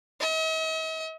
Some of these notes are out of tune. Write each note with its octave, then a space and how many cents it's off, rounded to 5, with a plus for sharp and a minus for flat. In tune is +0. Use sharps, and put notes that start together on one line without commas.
D#5 +45